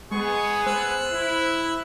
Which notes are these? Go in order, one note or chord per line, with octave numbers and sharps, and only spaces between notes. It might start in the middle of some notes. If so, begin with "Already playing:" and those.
G#3 B3 G#4 C#6
C5 E6 F#6
E4